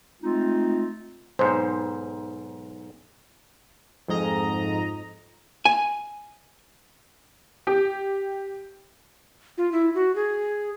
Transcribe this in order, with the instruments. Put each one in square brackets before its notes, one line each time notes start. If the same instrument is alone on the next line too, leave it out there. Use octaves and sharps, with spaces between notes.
[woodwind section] G#3 A3 C4 D#4 F4
[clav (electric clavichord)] B1 G#2 [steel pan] C5
[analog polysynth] F2 G#2 D#5 A#5
[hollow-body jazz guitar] G#5
[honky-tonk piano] G4
[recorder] F4
E4
F#4
G#4